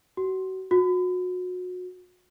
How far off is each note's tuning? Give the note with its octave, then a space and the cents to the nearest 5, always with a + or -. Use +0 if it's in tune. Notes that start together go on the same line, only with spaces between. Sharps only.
F#4 +30
F#4 -30